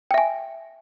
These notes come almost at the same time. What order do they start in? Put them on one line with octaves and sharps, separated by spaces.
G5 E5 G#5